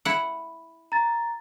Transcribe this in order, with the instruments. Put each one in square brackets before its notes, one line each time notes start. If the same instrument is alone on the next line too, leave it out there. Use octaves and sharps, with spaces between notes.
[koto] E4 F#5
[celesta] A#5 A6